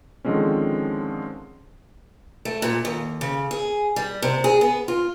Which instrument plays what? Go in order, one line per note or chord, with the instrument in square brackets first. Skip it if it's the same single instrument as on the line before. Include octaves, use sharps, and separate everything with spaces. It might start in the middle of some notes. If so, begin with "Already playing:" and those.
[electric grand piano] D3 D#3 F3 G#3 C4 C#4
[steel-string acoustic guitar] A3
A#2
D#2
C#3
G#4
G3
C3
G#4
B3
F4